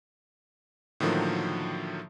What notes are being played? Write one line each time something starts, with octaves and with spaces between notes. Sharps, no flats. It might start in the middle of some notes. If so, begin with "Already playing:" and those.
A2 D3 D#3 F3 F#3 A#3